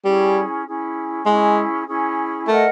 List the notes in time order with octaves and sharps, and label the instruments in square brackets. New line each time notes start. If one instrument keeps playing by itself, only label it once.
[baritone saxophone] G3 [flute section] C#4 E4 G#4
[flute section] C#4 E4 G#4
[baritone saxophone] G#3 [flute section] C#4 E4 G#4
[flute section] C#4 E4 G#4
[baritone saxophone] A3 [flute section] A#4 D#5 F#5